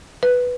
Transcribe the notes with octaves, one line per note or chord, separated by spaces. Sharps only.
B4